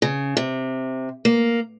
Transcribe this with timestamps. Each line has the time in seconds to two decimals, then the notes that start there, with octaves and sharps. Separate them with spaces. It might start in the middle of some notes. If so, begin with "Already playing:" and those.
0.02 C#3
0.37 C3
1.25 A#3